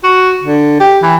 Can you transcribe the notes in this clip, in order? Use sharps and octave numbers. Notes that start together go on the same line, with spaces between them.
F#4
D3
G4
E3